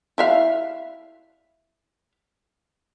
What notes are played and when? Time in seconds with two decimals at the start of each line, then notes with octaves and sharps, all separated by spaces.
0.18 E4 E5 F5